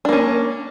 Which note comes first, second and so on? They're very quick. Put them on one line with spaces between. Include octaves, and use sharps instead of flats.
D4 A#3 C#4